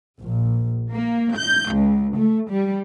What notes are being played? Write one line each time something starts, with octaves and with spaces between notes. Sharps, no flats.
A#1
A#3
G6
C#2
A3
G3